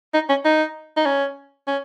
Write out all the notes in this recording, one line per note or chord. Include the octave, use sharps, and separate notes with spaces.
D#4
C#4
D#4
D#4
C#4
C#4